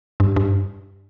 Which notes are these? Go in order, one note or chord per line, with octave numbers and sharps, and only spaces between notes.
G2
G2